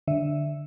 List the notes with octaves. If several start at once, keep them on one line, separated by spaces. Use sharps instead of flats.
D3 E5